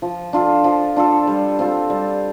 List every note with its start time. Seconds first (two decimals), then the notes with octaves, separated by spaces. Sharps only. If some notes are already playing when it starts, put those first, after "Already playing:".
0.02 F3
0.33 D4 F4 A4
0.64 F3
0.96 D4 F4 A4
1.27 G3
1.59 C4 F4 A4
1.90 G3